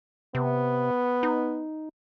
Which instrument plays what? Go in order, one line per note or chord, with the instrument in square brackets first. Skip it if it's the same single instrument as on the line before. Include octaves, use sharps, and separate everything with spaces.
[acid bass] C3 [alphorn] B3
[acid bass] D#4